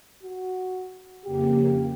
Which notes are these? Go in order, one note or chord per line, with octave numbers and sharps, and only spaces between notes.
F#4
F2 C#3 A#3 G4